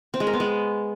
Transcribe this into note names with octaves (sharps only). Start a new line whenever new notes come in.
C4
G#3
A#4
B3
G#3